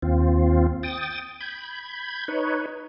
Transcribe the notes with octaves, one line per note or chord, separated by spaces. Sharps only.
D#2 C4 F4
G5 D#6 A6
B5 G6 G#6
D#4 B4 C#5